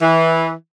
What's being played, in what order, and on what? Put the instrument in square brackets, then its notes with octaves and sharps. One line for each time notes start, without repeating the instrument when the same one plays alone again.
[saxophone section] E3